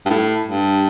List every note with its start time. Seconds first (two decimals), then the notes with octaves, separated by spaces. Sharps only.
0.06 G2
0.10 A2
0.46 G2